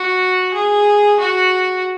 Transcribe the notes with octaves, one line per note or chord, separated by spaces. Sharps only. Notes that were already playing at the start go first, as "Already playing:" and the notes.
Already playing: F#4
G#4
F#4